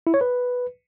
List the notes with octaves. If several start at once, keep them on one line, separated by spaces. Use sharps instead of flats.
E4
C#5
B4